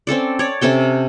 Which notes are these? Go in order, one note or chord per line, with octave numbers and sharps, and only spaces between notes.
C4 C#4 A4 D5
C#5 D5
C3 C#4 A4 G5